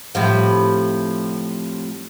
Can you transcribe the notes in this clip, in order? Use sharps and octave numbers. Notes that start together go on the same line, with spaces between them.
A2 C3 F3